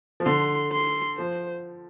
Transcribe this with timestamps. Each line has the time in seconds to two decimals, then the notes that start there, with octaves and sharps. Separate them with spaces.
0.20 F3
0.26 D3 C6
0.72 C6
1.18 F3 C5